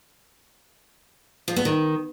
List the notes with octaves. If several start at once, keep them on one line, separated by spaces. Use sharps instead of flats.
F3
B3
D#3